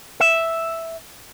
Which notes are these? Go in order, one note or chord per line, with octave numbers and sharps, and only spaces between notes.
E5